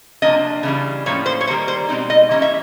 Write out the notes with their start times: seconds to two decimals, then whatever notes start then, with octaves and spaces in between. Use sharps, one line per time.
0.22 C3 F3 A#3 D4 D#5
0.63 C#3 E3 G3
1.06 A2 F3 A#3 C#4 C#5
1.26 C5
1.41 C#5
1.47 D#3 G3 A#3 C5
1.68 C5
1.89 B2 G#3 C4 D#4
2.10 D#5
2.31 E3 G3 A#3 C#4 D#5
2.42 E5